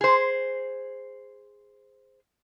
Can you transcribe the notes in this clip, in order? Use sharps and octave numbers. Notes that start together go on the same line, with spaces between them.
G#4 C5